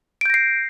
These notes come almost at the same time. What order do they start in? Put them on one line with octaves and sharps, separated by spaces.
D7 G6 A#6 C7